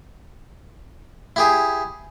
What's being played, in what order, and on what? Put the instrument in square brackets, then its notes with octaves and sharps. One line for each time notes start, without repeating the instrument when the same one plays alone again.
[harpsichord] E4 G4 G#4